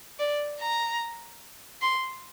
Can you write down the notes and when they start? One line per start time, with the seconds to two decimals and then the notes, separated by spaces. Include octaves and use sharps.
0.19 D5
0.59 A#5
1.81 C6